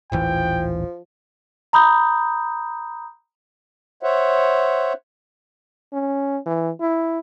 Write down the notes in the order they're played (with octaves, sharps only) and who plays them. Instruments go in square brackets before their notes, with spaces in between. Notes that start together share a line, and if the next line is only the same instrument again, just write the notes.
[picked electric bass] D#1 A1 E3 [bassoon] F3 [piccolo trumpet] G5
[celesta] A#5 B5 D#6 G6
[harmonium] C5 C#5 E5 F#5
[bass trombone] C#4
E3
E4